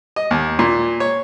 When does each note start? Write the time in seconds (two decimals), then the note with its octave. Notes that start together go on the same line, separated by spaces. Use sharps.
0.16 D#5
0.31 D#2
0.59 A#2
1.00 C#5